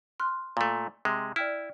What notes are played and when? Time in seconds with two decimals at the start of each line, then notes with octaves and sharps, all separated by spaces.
0.20 C6 F6 F#6
0.57 A#2 A3
1.05 C3 G#3
1.36 E4 D5 G5 F6